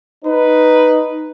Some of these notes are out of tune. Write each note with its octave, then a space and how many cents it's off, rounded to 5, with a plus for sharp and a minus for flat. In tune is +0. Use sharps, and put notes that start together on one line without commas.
D#4 +0 B4 +0